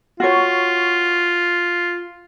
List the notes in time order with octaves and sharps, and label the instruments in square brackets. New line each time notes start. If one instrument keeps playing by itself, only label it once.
[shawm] F4 [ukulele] F#4 C#5